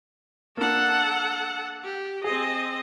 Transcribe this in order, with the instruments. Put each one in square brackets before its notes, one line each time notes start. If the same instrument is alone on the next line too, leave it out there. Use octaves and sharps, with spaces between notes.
[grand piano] A#3 D4 [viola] A4 F#5
[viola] G4
[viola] C4 D#5 [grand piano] G#4